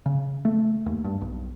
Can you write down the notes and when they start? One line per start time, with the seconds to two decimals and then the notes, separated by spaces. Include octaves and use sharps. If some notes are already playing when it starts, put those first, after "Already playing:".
0.06 C#3
0.45 A3
0.86 D#2
1.04 G2
1.21 B1